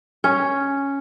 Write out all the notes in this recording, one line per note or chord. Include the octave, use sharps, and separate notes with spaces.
C#4